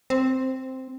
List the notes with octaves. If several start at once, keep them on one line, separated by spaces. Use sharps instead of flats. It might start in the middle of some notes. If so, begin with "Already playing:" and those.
C4